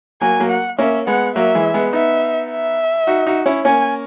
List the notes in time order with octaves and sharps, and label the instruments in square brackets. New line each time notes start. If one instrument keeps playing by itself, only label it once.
[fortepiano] F#3 A#3 [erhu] G#5
[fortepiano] F#3 A#3
[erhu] F#5
[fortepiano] A#3 C#4 [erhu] E5
[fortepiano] G#3 B3 [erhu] F#5
[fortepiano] F#3 A#3 [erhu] E5
[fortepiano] E3 G#3
G#3 B3
[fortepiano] B3 D#4 [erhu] E5
[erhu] E5
[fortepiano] D#4 F#4
D#4 F#4
C#4 E4
[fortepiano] A#3 C#4 [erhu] G#5